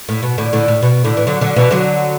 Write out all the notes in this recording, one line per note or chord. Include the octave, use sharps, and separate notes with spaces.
A2
B2
A2 D3
A2 D3
A2
B2
A2 D3
E3
D3 F#3
D3 F#3
B2 E3
D3 F#3